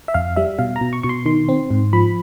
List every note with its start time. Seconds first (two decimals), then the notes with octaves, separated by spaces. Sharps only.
0.08 E5
0.14 F2 F5
0.36 G3 E5
0.59 B2 F5
0.76 A#5
0.81 B2
0.93 C#6
1.03 B2 C#6
1.09 C6
1.26 D#3 C6
1.49 C4
1.70 G#2
1.93 F3 B5